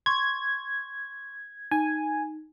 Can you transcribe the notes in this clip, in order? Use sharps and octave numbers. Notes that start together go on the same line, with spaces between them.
C6 C#6 G#6
D#4 G#5